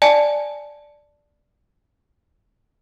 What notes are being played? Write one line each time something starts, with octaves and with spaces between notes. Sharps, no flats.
D5 G#5 A5